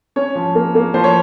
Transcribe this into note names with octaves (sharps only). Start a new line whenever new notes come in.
C#4 C#5
F3
A#3
A#3
F3 C5
C#5